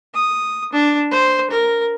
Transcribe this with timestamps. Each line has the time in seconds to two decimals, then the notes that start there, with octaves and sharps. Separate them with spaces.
0.14 D#6
0.73 D4
1.11 C5
1.50 A#4